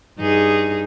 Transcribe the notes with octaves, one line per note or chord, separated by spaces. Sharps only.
G2 D#4 G#4